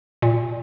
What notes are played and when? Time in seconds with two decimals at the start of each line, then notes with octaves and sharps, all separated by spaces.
0.22 A#2